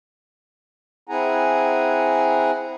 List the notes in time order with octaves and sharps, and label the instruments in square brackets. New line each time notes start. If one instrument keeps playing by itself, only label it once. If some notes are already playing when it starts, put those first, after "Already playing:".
[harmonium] C4 E4 G#4 F#5 G#5 A#5